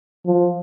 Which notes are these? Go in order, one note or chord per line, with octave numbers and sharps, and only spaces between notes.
F3